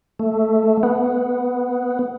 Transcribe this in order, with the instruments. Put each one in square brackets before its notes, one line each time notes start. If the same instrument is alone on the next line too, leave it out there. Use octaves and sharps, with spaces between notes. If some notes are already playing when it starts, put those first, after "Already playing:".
[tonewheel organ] A3
B3